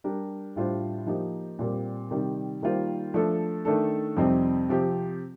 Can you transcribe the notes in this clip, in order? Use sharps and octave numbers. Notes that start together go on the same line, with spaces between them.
G3 D4 G4 A#4
A2 G3 D4 F4 C5
F3 A#3 D#4 G4 C5
A#2 G3 C4
C3 D#3 G3
D#3 G3 A#3 F4 C5
F3 A3 D4 A4
D#3 A3 D4 A4
F2 C3 G3 C4 D#4
C3 F3 C4 G4